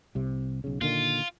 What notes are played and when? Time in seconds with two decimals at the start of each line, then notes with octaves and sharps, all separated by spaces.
0.15 C2 C3
0.64 B1 C#3
0.81 A#2 D3 D#3 F4